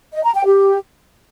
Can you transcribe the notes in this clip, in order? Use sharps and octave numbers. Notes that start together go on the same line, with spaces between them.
D#5
A#5
G5
G4